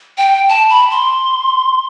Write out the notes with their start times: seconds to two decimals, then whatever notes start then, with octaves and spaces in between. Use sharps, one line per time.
0.18 G5
0.49 A5
0.70 B5
0.91 C6